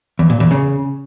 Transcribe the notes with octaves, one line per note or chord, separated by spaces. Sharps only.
E2
A#2
E2
C#3